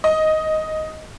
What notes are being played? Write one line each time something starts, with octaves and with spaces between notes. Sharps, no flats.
D#5